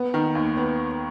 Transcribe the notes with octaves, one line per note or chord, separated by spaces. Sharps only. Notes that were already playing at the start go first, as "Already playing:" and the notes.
Already playing: B3
D#3
D#2
B3